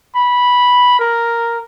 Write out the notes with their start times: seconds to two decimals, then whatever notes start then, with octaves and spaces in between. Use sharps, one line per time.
0.15 B5
0.99 A#4